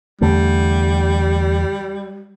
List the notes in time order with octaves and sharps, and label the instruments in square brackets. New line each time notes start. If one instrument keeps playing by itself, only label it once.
[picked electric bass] E2 D3 A3 [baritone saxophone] G3